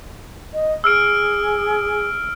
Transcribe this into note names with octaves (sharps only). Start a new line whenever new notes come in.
D#5
G#4 E6 F6 D7